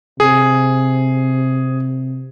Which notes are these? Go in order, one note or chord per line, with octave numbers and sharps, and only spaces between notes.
C3 G#4